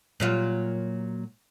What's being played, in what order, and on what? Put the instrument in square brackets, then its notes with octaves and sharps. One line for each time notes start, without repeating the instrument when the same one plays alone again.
[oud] A#2 F#3 F4